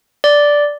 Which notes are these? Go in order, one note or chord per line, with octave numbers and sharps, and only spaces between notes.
D5